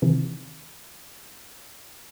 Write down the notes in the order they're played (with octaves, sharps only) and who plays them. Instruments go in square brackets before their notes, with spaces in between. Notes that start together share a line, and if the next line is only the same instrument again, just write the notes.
[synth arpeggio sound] C3 D#3 E3